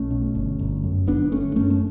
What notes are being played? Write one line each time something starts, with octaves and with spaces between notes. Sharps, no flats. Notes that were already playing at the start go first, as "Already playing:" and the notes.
Already playing: B1 A3 C#4
B2
G1
G1
F#2
G1 B3 D4
G1 A3 C#4
F#2 A3 C#4
A3